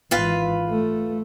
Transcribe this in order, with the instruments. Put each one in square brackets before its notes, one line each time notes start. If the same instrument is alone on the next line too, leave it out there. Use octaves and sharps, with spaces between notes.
[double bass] G#1 E3 [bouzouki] F4 B4 F5
[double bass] A3